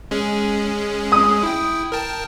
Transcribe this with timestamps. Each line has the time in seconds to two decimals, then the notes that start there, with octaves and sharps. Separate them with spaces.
0.11 G#3 C#4 G#4
1.12 D#6
1.43 E4 G5
1.92 A#4 G5 A5